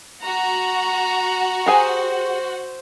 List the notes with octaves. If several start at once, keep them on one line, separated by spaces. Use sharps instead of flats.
F#4 F#5 A#5
G4 G#4 C5 G#5